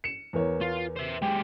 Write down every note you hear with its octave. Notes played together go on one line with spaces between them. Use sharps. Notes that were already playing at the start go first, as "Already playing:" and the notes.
C#7 E7
E2 A#4 C#5
F4
C5 E5
G#3 G4 G5